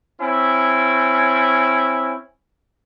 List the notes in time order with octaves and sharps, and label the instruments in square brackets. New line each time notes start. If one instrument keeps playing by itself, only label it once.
[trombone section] C4 C#4 E4